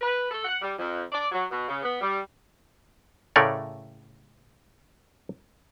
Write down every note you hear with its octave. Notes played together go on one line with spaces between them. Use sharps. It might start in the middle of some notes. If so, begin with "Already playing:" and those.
B4
A4
F#5
G3
F2
D5
F#3
B2
C#3
B3
G3
A2 C#3 A3 A#4 C#5 D5